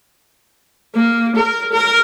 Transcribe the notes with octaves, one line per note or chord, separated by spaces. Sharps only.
A#3
A#4
A#4